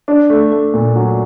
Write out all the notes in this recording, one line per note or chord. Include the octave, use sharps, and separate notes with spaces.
D4
A3
A3
A#2
F#3